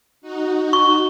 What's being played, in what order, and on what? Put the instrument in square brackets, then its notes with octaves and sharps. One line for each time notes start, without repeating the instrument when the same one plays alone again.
[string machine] D#4 F#4
[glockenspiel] C#6